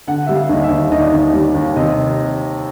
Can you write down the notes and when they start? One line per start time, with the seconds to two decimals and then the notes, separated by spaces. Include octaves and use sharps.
0.07 D3 F#5
0.26 G3 E5
0.35 F5
0.49 D#2 D#5
0.64 E5
0.71 D#2
0.92 D#2 D#5
1.00 D5
1.08 D#2 D#5
1.34 G3
1.55 D#2
1.76 C3 D#5